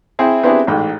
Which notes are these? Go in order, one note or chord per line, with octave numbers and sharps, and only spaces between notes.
C4 E4 G#4 G5
B3 C4 D4 E4 G4 G#4
A1 G#2 G5